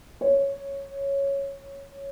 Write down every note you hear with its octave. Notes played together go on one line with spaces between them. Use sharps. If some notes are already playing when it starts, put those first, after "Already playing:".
C#5